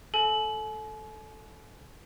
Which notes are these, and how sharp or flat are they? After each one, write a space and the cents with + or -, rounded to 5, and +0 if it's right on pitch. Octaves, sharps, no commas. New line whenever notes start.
A4 +0 G#5 +45